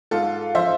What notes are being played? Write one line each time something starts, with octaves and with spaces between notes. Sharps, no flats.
G#2 F4 A4
F3 C5 E5